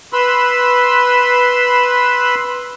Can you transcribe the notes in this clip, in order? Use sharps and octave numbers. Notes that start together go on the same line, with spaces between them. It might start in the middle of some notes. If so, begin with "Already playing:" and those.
B4 B5 C6 E6